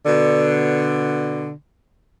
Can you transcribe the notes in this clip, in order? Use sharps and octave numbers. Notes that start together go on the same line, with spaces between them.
B2 D3